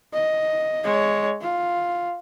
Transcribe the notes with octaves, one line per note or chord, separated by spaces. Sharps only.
D#5
G#3 C#5
F4